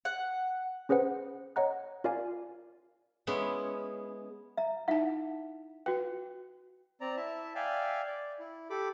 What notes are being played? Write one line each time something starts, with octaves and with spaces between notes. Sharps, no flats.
F#5
C#4 G#4 B4 C5 F#5
C#5 D#5 F#5 A#5 F#6
F4 A#4 D5 F5 G#5
G#3 B3 C#4 E4
E5 A#5
D#4 E4 E5 F#5 A5
F#4 B4 G5
C4 D5 A#5
E4 E5 A5
D5 E5 F5 G5 G#5
D5
E4
G4 A4 B5 D6